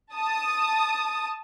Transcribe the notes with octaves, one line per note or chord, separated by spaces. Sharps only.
A5 D#6